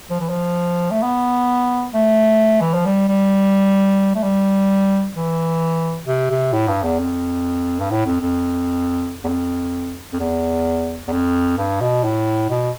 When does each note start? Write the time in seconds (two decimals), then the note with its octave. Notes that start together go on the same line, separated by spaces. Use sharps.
0.10 F3
0.20 E3
0.29 F3
0.91 A3
1.03 B3
1.94 A3
2.61 E3
2.74 F3
2.85 G3
3.08 G3
4.15 A3
4.23 G3
5.15 E3
6.07 C3
6.31 C3
6.53 A2
6.68 G2
6.83 E2
6.99 F2
7.81 G2
7.91 A2
8.06 F2
8.21 F2
9.24 E2
9.28 F2
10.13 F2
10.20 E2
11.08 E2
11.12 F2
11.58 G2
11.81 B2
12.04 A2
12.50 B2